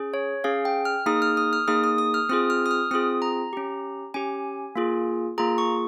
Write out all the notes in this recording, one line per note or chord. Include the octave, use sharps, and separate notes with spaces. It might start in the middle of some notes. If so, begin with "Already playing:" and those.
Already playing: C#4 G#4
C#5
C#4 G#4 F5
G5
F6
A#3 D#4 G#4 D#6
F6
D#6
F6
A#3 D#4 G#4 D#6
D#6
D#6
F6
C4 F4 G#4 D#6
F6
D#6
F6
C4 F4 G#4 D#6
A#5
C#4 G4
C#4 G4 G#5
A#3 F4 G#4
A#3 F4 G#4 A#5
C#6